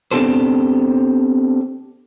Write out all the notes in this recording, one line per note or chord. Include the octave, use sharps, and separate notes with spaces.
B3 C4 D4 G4 A4 C5